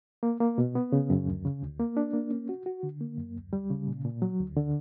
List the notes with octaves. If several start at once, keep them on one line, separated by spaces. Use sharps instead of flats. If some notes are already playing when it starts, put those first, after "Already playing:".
A#3
A#3
B2
B3
C#3
F#2
D2
C#3
D2
A#3
D4
A#3
C#4
F#4
F#4
D3
A#3
F#2
D2
G3
C#3
A#2
A#2
F#3
D2
D3